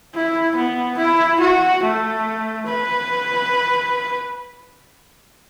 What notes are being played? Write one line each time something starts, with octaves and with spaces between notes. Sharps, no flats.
E4
B3
E4
F#4
A3
B4